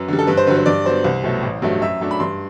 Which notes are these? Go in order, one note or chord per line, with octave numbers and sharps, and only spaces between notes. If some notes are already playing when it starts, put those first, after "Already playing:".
Already playing: F#2 B4
D3 G3
A4
G2 B4
C5
D3 F#3 B4
C5
G2 D5
F#3 B3 C5
C2
B2 F#3 A3
A1
G2 F#3 A3
F#2 E5
F#3 A3 D4
B5
G2 C6